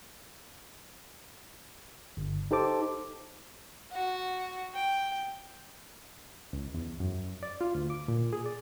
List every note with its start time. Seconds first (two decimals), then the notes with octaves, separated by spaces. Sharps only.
2.17 G1
2.51 D#4 G4 A4 C5 A5 D6
3.92 F#4
4.75 G5
6.53 C#2
6.74 E2
6.99 F#2
7.43 D5
7.61 F4
7.75 D2
7.90 D6
8.08 A#2
8.33 G#4
8.46 D5